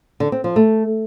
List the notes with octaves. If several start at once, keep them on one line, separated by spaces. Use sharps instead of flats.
D3
C4
F3
A3